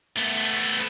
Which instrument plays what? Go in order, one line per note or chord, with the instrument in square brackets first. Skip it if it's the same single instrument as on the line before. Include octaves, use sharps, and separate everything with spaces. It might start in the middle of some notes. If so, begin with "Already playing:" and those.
[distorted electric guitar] A3 B3